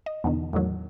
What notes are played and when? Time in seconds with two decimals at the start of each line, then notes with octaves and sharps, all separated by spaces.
0.06 D#5
0.24 E2 B2 D3 D#3
0.53 E2 A2 D#3 F#3